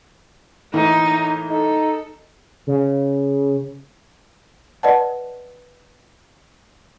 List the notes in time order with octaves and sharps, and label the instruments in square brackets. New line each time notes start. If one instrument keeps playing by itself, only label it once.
[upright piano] A2 E3 A#3 [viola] D#4
[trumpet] D#4 [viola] A4
[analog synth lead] C#3
[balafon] B4 D5 D#5 F#5 A5